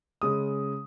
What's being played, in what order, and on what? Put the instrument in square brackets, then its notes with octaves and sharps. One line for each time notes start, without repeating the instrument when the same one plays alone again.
[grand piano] C#3 G#3 D#6